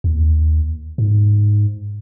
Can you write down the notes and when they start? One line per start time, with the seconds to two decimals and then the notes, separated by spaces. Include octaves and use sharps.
0.04 D#2
0.98 G#2